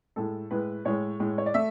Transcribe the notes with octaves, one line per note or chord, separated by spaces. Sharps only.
A2 G#3 A4
A2 G#3 B4
A2 G#3 C#5
A2 G#3
C#5
D5
A3 E5